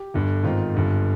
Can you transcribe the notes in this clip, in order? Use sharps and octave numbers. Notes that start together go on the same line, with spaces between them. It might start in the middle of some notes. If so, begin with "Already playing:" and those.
Already playing: G4
G1 G2 D3
G#1 G#2 D#3 F4
G1 G2 D3